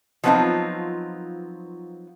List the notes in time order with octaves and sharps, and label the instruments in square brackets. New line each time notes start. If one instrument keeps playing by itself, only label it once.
[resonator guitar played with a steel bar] F3 F#3 B3 C4 D#4 F4